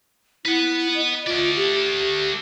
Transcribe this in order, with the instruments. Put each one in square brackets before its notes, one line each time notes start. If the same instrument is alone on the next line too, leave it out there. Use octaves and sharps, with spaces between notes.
[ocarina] E4 [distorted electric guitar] B4 F#5
[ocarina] D#5
[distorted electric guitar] A3 D5 [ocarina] F4
[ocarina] G4